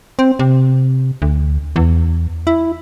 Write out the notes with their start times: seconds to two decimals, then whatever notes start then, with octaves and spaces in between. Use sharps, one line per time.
0.19 C4
0.39 C3
1.22 D2
1.76 E2
2.47 E4